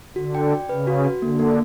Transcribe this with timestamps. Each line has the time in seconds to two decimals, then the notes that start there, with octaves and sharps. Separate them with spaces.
0.16 D3 F#4
0.35 G5
0.52 D5
0.69 C#3 B4
0.87 F#4
1.04 F#4
1.22 D3 A#3
1.39 A#3